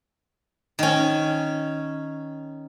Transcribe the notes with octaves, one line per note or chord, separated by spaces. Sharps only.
D#3 C#4